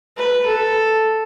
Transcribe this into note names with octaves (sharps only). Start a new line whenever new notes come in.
B4
A4